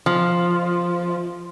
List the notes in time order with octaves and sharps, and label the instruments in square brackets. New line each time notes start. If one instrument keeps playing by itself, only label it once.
[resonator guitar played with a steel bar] F3